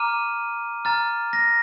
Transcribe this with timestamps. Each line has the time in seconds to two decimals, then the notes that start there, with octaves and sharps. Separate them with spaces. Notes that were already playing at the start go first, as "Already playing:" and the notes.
Already playing: A#5 D6 F6 D#7
0.85 A#5 F6 A6
1.33 A#6